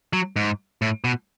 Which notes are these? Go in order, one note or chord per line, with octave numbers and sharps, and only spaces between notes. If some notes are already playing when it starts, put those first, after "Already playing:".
F#3
G#2
A2
B2